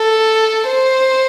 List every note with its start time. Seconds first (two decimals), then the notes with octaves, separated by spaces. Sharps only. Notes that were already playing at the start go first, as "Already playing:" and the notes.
Already playing: A4
0.67 C5